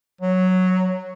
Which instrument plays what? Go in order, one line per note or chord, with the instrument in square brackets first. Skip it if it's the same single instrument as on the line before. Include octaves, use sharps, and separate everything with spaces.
[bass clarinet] F#3